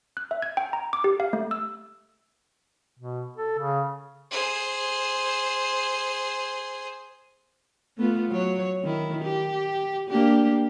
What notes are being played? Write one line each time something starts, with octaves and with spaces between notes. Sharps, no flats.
F#6
E5
G#6
G5
A#5
D6
G4
F5
A3
E6
B2
A4
C#3
G#4 C5
A3 B3 F4
F#3 C#5
D#3 E4
G4
A#3 D4 G4